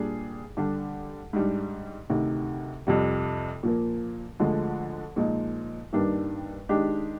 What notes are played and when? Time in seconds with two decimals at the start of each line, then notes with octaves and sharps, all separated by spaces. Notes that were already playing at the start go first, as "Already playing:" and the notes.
Already playing: A#2 G3 D4 G#4
0.57 D3 G3 D4 G4
1.33 G#2 G3 D4
2.10 D2 C3 D#3
2.87 F2 C3 G3
3.63 A#2 F3 A#3
4.39 D2 D3 F3 G#3
5.16 A#2 F3 G#3 D#4
5.93 G2 D#3 G3 A#3 D4
6.69 D#3 G#3 D4 G4